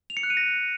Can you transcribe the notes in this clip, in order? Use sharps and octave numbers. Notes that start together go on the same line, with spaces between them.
F7
C#7
F#6
D#7
A#6